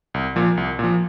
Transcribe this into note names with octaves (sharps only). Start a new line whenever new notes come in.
C2
A#2 F3
C2
A#2 F3